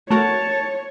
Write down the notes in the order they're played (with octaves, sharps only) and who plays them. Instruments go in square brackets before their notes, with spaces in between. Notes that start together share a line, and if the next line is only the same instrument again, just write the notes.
[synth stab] A3 F#4 A#4 [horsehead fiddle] C#5 [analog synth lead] A5